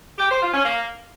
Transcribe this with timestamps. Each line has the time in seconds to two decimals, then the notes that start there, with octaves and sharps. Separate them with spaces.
0.18 G4
0.29 C5
0.41 F4
0.52 C#4
0.64 A#3